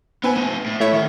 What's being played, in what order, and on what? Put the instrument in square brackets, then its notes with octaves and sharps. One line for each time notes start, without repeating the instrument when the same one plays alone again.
[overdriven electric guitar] B3 [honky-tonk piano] C4 B4 G#5
[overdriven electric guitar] A3 D#4 [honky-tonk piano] D#7
[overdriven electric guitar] A2
[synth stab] A3 E4 C#5 [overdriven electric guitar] E5
[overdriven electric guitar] D2 D#3